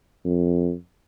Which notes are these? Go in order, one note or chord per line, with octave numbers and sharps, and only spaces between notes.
F2